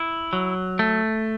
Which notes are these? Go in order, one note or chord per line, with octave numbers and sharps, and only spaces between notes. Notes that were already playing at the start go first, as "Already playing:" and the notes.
Already playing: E4
F#3
A3